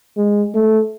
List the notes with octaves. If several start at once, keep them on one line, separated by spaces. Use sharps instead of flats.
G#3
A3